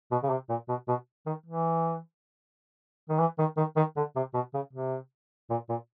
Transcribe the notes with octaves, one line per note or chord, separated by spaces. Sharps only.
B2
C#3
C3
A#2
B2
B2
D#3
E3
D#3
E3
D#3
D#3
D#3
D3
C3
B2
C#3
C3
A#2
A#2